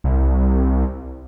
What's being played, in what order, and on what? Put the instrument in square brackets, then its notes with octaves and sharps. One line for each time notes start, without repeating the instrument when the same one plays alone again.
[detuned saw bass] C2